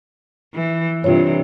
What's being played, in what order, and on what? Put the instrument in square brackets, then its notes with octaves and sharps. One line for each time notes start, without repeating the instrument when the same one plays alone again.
[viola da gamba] E3
[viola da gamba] G2 C3 E3 [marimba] F4 C#5